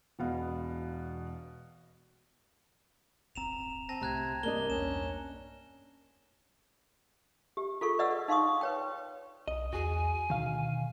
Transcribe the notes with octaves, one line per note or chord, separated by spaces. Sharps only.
E1 B2 B3 F5
D1 G1 C4 A#5 E7 F7
C4 A5 A#6
C2 C3 A3 A#5 F#6 G#6
G2 C3 A#3 D4 D#5 G7
B1 E2 G2 C#4 E7
G4
F4 G#4 A4 C#6
B4 D5 D#5 F#5 E6
D#4 F5 C6 C#6 D#6
B4 C#5 G5
B1 D#5
E2 F#4 G#4 G#5
D2 B2 D#3 F5